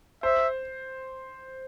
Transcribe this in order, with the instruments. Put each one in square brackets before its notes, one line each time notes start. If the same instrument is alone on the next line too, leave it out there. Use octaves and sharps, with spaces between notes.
[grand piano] C5 [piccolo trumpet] E5